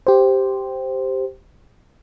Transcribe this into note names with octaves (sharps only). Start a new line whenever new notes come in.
G4 C5